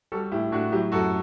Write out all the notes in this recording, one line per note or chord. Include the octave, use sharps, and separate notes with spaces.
G3 F#4 A4
A2 E4 G4
A2 D4 F#4
F#3 E4 G4
F#2 F#4 A4